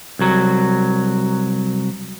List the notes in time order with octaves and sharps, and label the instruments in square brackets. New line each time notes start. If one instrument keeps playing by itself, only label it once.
[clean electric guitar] C2 F#3